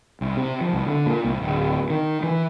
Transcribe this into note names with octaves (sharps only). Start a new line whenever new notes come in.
C2
C3
F3
C2
D3
A#2
C2
D1
D#3
E3